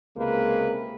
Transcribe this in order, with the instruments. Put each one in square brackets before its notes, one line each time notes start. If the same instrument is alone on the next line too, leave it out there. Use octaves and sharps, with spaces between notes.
[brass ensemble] C#2 C3 G#3 A#3 B4